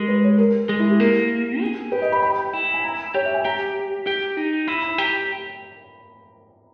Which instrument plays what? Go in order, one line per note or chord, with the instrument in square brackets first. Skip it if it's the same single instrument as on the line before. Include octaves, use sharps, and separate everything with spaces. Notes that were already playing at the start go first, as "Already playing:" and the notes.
Already playing: [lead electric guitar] G#3 [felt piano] G4 A#4
[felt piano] B4
C#5
A#4
[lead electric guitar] G#3 [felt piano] G#4
[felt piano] E4
G4
[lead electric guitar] A#3 [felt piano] A#4
[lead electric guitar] G#4
[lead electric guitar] G4 [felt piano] B4
[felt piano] D#5
B5
B5
[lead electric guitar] E4
[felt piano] G#5
A#5
[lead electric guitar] G4 [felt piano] C#5
[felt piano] E5
G#5
[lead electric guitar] G4 [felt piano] A#5
[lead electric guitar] G4
D#4
[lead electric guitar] E4 [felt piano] B5
[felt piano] B5
[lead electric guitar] G4 [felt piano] A#5